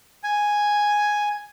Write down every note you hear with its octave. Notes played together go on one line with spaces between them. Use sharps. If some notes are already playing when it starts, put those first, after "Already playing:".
G#5